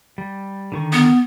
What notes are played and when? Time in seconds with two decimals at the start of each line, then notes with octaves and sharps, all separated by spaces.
0.18 G3
0.72 D3 D#3 C#6
0.93 B3